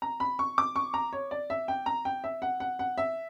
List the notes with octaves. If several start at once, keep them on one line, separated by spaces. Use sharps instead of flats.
A#5
B5
C#6
D6
C#6
A#5
C#5
D5
E5
G5
A#5
G5
E5
F#5
F#5
F#5
E5